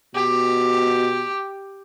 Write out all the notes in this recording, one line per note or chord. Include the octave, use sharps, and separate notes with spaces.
B2 G4